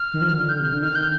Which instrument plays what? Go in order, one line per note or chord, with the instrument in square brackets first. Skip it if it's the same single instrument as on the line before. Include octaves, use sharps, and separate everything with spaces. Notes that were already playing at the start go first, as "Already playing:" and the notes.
Already playing: [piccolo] F6
[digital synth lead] D#3
F3
D#3
[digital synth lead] D3 [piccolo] F6
[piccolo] G6
[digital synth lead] C3 [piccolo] F6
[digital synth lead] D3
[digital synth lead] D#3 [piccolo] F6
[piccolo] G6